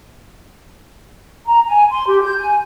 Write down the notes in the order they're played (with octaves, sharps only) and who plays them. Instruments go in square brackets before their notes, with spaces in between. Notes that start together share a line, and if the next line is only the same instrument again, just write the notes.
[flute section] A#5
G#5
C6
G4
G6
G#5